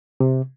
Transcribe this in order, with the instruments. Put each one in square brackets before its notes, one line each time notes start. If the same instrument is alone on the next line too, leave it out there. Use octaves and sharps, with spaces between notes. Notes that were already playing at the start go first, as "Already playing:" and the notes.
[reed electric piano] C3